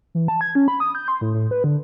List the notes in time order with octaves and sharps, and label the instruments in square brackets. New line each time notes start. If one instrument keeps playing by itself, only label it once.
[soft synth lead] E3
A5
G#6
C#4
B5
D#6
G6
C6
A2
A2
B4
D3